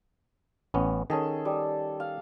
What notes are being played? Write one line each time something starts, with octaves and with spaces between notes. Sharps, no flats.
A1 B3 C#4
D#3 C#4 G#4 A4
G3
F5